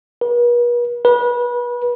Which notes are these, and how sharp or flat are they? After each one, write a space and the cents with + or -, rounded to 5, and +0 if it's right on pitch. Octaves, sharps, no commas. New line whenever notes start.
B4 -45
B4 -30